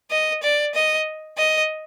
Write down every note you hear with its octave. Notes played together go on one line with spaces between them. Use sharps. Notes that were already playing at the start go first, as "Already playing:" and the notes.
D#5
D5
D#5
D#5